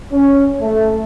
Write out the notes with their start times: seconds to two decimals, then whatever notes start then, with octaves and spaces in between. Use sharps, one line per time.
0.12 C#4
0.60 A3